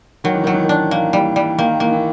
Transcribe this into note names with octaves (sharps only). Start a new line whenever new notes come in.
D#3 F#3
E3
D#3 F#3
E3
D#3
D4
E3 A#3
E3 G3
E3 G3
D#3 A#3
E3 A#3
E3